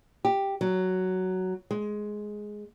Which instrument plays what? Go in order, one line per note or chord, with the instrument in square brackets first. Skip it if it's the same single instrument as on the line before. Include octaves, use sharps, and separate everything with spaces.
[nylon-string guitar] G4
F#3
G#3